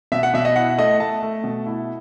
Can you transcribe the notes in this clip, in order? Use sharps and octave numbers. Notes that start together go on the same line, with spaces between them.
B2 E5
F#5
B2 E5
D#5
E4 F#5
A3 D#5
A3 A5
A3
B2
E4